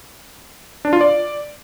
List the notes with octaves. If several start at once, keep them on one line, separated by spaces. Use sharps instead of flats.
D4
F4
D5